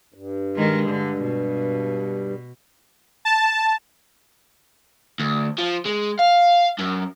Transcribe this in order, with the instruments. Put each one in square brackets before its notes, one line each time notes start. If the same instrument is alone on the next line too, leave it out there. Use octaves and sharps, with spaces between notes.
[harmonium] G2
[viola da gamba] D#3 G#3
D3
B2
[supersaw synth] A5
[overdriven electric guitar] D2
F3
G#3
F5
F#2